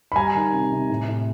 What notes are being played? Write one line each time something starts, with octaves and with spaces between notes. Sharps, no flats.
B5
G3 G#5 A#5
D#3
C3
C3
A2
A2